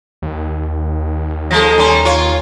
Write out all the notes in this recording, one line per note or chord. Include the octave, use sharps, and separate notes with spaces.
D#2
F3 G#3 A4 A#5 A#6
G3 C#4 G#5 A#5 C6
F4 C#5